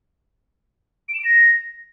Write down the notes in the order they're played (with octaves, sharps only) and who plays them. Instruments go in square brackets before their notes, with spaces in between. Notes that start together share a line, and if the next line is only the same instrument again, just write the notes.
[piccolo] D7
E7
D7
A#6